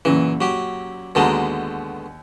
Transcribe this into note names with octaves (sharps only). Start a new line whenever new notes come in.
F#2 A#2 C#3 E3
F#3 G4
D#2 B2 D3 G#3 A5 A#5